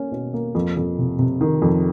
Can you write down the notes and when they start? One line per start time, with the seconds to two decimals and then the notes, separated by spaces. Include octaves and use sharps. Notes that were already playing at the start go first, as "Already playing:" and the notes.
Already playing: A#3 C#4
0.12 B2
0.34 A#3
0.55 F2
0.77 F2
0.98 C3
1.19 C3
1.41 D#3
1.62 F2